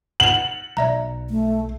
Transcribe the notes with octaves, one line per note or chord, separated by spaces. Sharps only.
F#5 F7 F#7
B1 D5 E5 A#5
A3